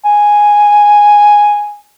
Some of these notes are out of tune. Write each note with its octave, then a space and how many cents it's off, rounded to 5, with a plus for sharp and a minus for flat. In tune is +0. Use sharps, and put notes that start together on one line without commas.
G#5 -5